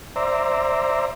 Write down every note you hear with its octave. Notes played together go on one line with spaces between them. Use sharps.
C5 D5 E5 A#5